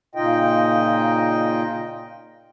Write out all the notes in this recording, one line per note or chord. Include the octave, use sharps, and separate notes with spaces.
A#2 C#3 D#4 F4 D#5 G5